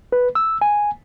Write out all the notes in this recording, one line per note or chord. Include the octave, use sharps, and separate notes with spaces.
B4
E6
G#5